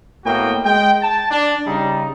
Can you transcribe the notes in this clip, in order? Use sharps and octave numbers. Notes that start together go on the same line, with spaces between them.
A2 A#3 B3 F#4 D#5 G5
G#3 G5
A5
D4
C#3 G3 D#4